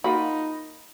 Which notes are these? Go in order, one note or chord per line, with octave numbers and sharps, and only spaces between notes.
A#3 D#4 F4 F#4 B5